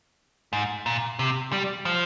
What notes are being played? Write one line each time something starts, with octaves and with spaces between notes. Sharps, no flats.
G#2
A#2
C3
G3
F3